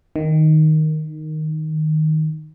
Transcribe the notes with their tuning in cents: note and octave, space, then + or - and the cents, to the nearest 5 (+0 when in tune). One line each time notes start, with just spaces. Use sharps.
D#3 +0